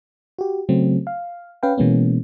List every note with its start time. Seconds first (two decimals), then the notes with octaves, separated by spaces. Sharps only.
0.39 F#4 G4
0.69 C#3 F#3 A3 C4
1.07 F5
1.63 C#4 B4 F5 G5
1.78 B2 E3 G#3 A#3 B3 C#4